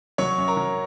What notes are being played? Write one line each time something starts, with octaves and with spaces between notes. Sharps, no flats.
F#3 C#5 C#6
F#2
A#4 A#5
F#3